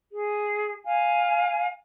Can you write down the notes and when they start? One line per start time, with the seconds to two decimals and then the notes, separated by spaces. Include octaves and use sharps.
0.12 G#4
0.85 F5 G#5